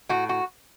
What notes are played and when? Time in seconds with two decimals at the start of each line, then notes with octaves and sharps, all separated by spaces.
0.09 A2 F#4
0.29 F#4